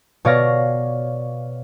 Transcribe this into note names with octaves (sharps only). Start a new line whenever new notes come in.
B2 C#5 D5 F5 C#6 A#6